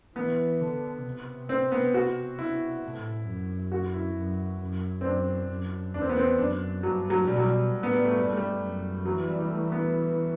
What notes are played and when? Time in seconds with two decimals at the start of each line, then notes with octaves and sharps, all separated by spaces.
0.16 E3 B3
0.60 D3
1.04 C3
1.49 C4
1.72 B3
1.94 F#4
2.39 E4
2.83 A2
3.27 F#2
3.72 F#4
3.94 E4
4.16 F#2
4.60 F#2
5.01 C4
5.05 F#2 D4
5.49 F#2
5.94 E2 D4
6.01 C4
6.09 B3
6.17 C4
6.38 F#2 D4
6.82 G2 F#3
7.10 F#3
7.27 B2 G3
7.36 F#3
7.44 G3
7.71 A2
7.83 B3
7.94 G3
8.05 A3
8.17 G2 G3
8.27 A3
8.37 G3
8.61 F#2
9.05 E3 F#3
9.27 G3
9.40 G3
9.50 A3
9.72 B3